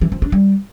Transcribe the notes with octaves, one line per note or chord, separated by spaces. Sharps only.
E3
F3
D4
G3